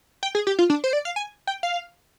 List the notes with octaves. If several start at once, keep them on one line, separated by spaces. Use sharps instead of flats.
G5
G#4
G4
F4
D4
C5
D5
F5
G#5
G5
F5